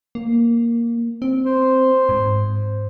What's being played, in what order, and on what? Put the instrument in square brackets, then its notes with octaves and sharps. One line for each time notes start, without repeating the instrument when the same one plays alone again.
[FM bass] A#3
C4
[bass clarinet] C5
[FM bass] G#2